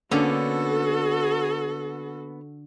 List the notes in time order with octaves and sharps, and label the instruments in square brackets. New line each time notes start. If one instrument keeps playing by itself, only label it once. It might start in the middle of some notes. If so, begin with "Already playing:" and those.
[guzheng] D3 [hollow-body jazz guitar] A#3 B3 C#4 [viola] F#4 A4